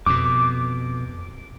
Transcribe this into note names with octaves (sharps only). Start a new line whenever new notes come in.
F2 B2 D6